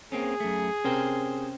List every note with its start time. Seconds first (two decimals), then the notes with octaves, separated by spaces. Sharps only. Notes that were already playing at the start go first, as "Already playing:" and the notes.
0.12 A#3 C4 C#4 G#4
0.40 F#2 A3
0.85 C3 C#4 A#4 C5 G5